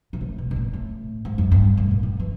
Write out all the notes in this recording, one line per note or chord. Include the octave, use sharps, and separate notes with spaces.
A#2
A2
B2
B2
A#2
A2
G#2
F#2
G2
A2
A#2
D#3
E3